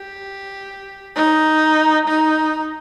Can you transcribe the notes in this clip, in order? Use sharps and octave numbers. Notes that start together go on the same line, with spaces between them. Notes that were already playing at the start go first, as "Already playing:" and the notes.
Already playing: G4
D#4
D#4